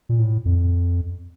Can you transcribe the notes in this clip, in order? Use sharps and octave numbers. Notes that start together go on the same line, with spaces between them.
A#2
A2
F2